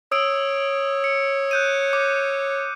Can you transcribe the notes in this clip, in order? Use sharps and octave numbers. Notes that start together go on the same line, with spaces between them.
C#5 D#6 E6 D7
C#7
F#6 G6 D#7
D6